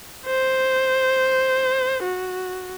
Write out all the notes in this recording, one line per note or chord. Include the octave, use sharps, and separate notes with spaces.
C5
F#4